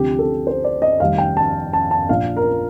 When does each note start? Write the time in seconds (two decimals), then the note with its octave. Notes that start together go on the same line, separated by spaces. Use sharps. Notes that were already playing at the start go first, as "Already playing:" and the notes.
Already playing: D2 C3 F3 G4
0.19 A4
0.47 C5
0.64 D5
0.82 D#5
1.00 F1 F2 D#3 G3 F5
1.18 G5
1.37 A5
1.73 A5
1.91 A5
2.09 A#1 A#2 F3 F5
2.36 A#4